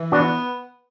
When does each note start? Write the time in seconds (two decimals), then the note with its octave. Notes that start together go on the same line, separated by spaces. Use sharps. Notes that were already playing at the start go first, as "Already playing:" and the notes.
Already playing: E3
0.12 B3 D4 F#4